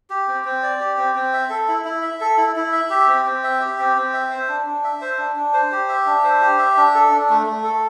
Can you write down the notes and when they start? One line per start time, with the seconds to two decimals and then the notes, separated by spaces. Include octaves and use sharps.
0.10 G4
0.28 C4
0.45 C4
0.63 D5
0.80 G4
0.97 C4
1.15 C4
1.33 E5
1.50 A4
1.68 E4
1.85 E4
2.02 E5
2.21 A4
2.37 E4
2.56 E4
2.72 E5
2.90 G4
3.08 C4
3.26 C4
3.44 E5
3.60 G4
3.79 C4
3.96 C4
4.14 E5
4.31 C5
4.48 D4
4.66 D4
4.84 E5
5.02 C5
5.18 D4
5.36 D4
5.54 C5
5.72 G4
5.89 E5
6.06 D4
6.24 C5
6.42 G4
6.58 E5
6.77 D4
6.95 A4
7.12 D4
7.30 A3
7.46 A3
7.64 A4